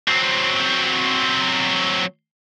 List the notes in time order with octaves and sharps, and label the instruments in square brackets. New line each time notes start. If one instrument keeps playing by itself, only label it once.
[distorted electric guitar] F#3 C4